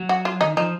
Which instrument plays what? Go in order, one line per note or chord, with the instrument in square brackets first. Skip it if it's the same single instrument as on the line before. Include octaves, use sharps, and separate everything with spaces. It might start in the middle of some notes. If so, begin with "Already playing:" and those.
Already playing: [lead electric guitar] F#3
[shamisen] F#4
F4
[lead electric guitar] D#3 [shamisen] D#4
[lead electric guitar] F3 [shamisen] D#4